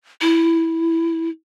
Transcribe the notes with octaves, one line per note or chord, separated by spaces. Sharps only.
E4